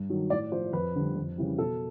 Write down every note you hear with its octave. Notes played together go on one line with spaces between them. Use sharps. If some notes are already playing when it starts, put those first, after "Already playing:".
Already playing: G2
D#3 F#3
A2 D5
F3 C5
F2 B4
D3 G3
F2
C#3 E3 G3
B2 A4